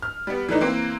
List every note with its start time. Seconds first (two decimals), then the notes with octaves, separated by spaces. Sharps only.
0.02 F6
0.27 G3 B3
0.49 E3 A3 D4 D#4
0.61 E3 A#3 C4